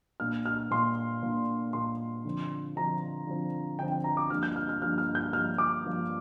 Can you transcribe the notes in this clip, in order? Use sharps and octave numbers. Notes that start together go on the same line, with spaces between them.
A#2 A#3 D4 F6
F6
A#2 A#3 D4 C6
A#2 A#3 D4
A#2 A#3 D4 C6
D3 F3 C4
D3 F3 C4 A#5
D3 F3 C4
D3 F3 C4 G5
G5
A#5
D6
G2 F3 A#3 D4 F6
G6
F6
F6
G2 F3 A#3 D4 F6
F6
G6
G2 F3 A#3 D4 F6
D6
G2 F3 A#3 D4